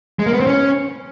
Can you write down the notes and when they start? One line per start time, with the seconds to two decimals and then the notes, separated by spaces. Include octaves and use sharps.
0.19 G#3
0.26 A#3
0.33 B3
0.40 C4
0.47 C#4